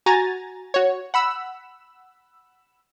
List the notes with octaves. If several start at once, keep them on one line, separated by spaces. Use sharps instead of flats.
F#4 G#5 A#5 A6
F#4 C#5
F#5 B5 E6